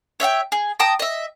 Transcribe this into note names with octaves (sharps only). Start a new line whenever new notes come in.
C#5 E5 F#5 G5
G#4
G5 A5 A#5 D#6
D#5 E5